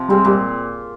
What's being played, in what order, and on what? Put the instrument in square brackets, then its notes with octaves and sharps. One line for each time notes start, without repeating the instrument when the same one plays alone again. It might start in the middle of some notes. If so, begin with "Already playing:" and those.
Already playing: [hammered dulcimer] C3 F3
[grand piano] G3 [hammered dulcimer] G#3 C4 F4
[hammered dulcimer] A#2 [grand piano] G3